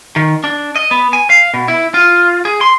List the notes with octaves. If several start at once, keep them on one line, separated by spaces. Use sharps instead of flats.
D#3
D4
D#5
B3
G#5
F5
B2
E4
F4
G#4
C6